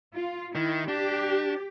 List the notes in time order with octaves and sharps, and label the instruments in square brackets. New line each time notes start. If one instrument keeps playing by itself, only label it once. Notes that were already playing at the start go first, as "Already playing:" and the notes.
[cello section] F4
[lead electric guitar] D#3 [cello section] E4
[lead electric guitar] D4 [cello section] G4